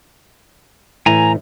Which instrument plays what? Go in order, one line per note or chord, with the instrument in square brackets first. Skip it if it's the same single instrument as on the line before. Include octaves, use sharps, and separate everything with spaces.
[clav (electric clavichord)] A2 E3 [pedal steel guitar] G#5 A#5